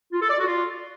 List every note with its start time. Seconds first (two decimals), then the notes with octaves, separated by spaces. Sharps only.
0.13 F4
0.21 A4
0.30 D5
0.38 F#4
0.46 F4